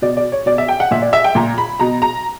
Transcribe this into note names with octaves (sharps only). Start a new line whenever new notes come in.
B2 D5
D5
C#5
B2 D5
E5
G5
F#5
A#2 E5
D5
E5
G5
A#2 A#5
B5
B2 A#5
A#5